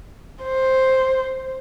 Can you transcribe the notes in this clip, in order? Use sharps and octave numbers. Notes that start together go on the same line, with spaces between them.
C5